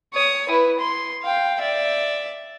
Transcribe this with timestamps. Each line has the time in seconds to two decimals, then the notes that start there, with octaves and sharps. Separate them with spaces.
0.14 C#5 D#6
0.49 E4 B4
0.80 C6
1.23 F5 G5
1.61 D5 E5